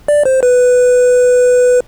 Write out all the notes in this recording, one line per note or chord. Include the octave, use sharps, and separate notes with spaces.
D5
C5
B4